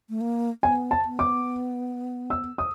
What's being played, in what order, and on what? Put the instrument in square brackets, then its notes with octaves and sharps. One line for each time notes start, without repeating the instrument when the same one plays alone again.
[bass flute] A3
A#3
[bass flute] B3 [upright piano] G#5
[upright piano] A5
[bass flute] B3
[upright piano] D6
E6
D#6